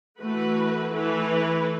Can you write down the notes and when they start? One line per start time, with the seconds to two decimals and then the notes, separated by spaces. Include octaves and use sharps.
0.19 E3 A3 F#4 B4
0.93 E3 A3 E4 B4